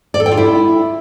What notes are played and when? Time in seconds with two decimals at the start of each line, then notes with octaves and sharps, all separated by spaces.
0.14 D5
0.20 A4
0.26 G5
0.32 F4
0.37 E4